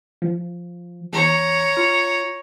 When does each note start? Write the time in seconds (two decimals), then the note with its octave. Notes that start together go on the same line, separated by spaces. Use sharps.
0.22 F3
1.12 E2 C#5 A#5
1.77 F4